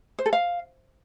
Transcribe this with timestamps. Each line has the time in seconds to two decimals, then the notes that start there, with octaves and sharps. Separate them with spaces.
0.19 C5
0.26 A4
0.33 F5